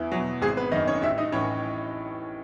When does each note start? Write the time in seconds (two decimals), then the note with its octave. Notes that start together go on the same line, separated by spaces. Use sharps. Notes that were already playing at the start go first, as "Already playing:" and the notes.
Already playing: E2 E3 E4
0.12 B2 F#3
0.42 G#1 G#3 G#4
0.57 B3 B4
0.72 F#2 D#3 D#4 D#5
0.87 C#4 C#5
1.02 A1 E4 E5
1.18 D#4 D#5
1.32 A2 E3 C#4 C#5